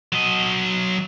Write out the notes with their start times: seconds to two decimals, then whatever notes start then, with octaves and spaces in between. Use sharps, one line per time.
0.12 F#3 D#5